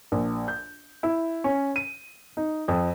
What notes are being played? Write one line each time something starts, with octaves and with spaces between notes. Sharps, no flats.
A#1
G6
E4
C#4
D#7
D#4
F2